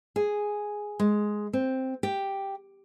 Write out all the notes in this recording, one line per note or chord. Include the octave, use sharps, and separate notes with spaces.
G#4
G#3
C4
G4